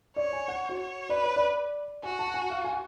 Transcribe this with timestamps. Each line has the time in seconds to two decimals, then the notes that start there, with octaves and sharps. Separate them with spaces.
0.16 C#5 D5
0.33 G#5
0.48 F#5
0.69 F#4
0.80 C#5
1.09 B4 D5
1.24 C#5
1.36 D5
2.03 F#4 G#5
2.19 A5
2.34 G#5
2.50 F5
2.65 G#5